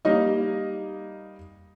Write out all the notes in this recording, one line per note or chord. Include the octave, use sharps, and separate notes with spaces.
G3 A#3 D#4 D#5